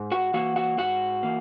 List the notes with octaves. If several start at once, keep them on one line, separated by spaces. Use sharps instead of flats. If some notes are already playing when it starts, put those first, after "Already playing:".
Already playing: G#2
F#4 F#5
E3 A#3 F#4 F#5
F#4 F#5
G#2 F#4 F#5
E3 A#3